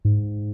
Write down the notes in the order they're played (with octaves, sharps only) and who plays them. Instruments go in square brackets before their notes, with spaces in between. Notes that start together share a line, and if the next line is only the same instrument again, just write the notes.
[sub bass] G#2